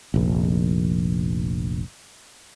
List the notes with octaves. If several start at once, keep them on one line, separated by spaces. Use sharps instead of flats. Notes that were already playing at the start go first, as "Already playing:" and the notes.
F1 A#1